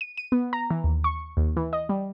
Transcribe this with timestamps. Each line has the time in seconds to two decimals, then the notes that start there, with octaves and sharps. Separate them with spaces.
0.01 D#7
0.17 D#7
0.32 B3
0.53 A#5
0.71 E3
0.84 D#2
1.04 C#6
1.37 D#2
1.57 E3
1.73 D#5
1.89 G3